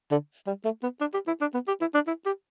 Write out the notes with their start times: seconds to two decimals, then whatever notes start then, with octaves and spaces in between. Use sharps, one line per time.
0.11 D3
0.47 G3
0.64 A3
0.83 B3
1.01 D4
1.14 G4
1.27 E4
1.41 D4
1.54 B3
1.68 G4
1.81 E4
1.94 D4
2.07 E4
2.26 G4